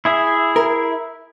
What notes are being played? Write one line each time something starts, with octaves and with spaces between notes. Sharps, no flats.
E4 G#4 E5
A#4